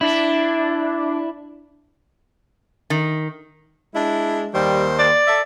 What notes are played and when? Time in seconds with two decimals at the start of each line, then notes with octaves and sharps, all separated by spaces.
0.01 D4 E4
2.90 D#3
3.95 G#3 D4 E4
4.54 D#2 D#3 G3 C5
4.99 D5
5.26 A4 E5